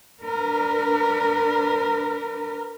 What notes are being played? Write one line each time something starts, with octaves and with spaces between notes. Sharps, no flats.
D4 A#4 B4